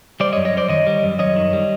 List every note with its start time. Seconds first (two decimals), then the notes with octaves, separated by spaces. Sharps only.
0.20 G3 C5 D5
0.33 C#5 D#5
0.37 F#2
0.45 C#5 D#5
0.53 F#2 C5 D5
0.70 D#3 C#5 D#5
0.87 G3
1.03 F#2
1.19 F#2 C#5 D#5
1.36 D#3
1.53 G3